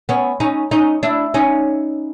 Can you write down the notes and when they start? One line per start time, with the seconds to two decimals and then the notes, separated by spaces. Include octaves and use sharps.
0.09 B3 C#4
0.40 C#4 D#4
0.71 C#4 D#4
1.03 D4 E4
1.34 C#4 D#4